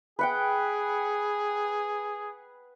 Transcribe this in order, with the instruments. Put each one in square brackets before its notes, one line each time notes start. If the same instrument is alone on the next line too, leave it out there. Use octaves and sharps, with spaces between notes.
[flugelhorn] G#4 [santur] B4 F#5 G5